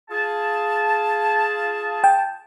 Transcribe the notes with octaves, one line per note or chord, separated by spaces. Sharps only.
F4 G#4 A5
G5